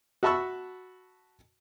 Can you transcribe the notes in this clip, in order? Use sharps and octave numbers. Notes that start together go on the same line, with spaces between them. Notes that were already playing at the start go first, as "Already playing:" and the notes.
F#4 E5 A5 B5 C#6 E6